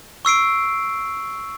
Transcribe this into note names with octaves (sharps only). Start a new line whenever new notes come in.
C#6 E6 C7 D7